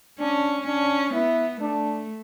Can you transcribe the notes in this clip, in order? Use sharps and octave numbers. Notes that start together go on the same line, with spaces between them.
C#4 D4
C#4 D4
B3 E4
A3 D4